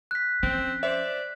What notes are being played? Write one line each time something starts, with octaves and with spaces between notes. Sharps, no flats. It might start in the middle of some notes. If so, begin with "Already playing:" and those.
F#6 B6
F3 C4 C#4
C5 D5 E5